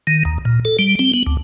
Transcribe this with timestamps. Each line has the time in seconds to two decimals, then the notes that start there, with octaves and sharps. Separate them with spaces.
0.07 D#3
0.25 D#2
0.45 A#2
0.65 A4
0.79 G3
0.99 C4
1.14 B3
1.27 D2